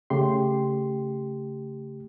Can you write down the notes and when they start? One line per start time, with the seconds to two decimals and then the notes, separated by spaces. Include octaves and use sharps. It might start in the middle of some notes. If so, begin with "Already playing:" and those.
0.10 C#3 A3 G4 C6